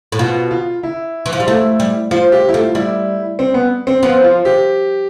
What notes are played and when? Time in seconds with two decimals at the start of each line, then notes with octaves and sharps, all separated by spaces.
0.12 A2
0.19 B2 F4
0.51 F4
0.83 E4
1.26 E3
1.33 F3
1.40 G3
1.47 A3 E4
1.80 G3
2.11 F3 F4
2.32 G4
2.49 E4
2.54 A3 F4
2.75 G3 E4
3.39 C4
3.54 B3
3.87 C4
4.03 F3 B3
4.24 F4
4.45 G4